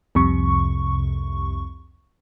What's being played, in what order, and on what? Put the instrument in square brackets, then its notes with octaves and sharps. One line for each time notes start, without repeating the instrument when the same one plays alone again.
[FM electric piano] C2 F2 C3 C#6